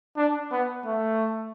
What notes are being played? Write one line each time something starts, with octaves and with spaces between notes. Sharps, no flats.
D4
B3
A3